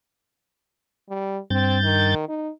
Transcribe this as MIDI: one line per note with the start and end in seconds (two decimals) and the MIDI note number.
1.09 1.38 55
1.50 2.15 43
1.50 1.78 60
1.50 2.15 91
1.50 2.15 93
1.83 2.24 51
2.28 2.50 63